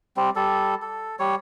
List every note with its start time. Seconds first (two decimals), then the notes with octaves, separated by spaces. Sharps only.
0.17 G3 C4
0.36 G3 A4
0.82 A4
1.19 G3 C#5